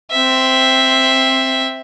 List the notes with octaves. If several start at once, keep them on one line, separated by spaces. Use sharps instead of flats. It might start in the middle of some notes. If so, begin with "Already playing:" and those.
C4 E5